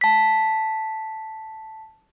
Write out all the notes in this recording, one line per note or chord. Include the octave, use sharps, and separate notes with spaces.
A5 B6